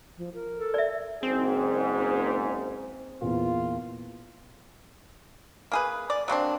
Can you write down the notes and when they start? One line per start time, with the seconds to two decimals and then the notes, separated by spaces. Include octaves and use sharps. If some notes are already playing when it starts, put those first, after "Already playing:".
0.17 F3
0.34 A#4
0.56 A4
0.74 D5 E5
1.23 F#1 G#2 C4 G#4
3.22 E2 A#2 F4
5.72 A#3 G#4 B4
6.10 D5
6.28 F#3 A#3 C4 D4